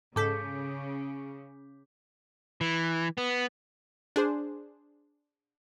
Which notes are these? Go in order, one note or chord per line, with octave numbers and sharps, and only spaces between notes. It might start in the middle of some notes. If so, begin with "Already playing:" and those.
G#2 C#3 A4 D6 G6 B6
E3
B3
D4 G#4 C5